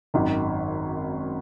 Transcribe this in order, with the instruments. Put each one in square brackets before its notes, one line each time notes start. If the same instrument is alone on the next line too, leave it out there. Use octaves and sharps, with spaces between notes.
[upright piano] G#1 F#2 D#3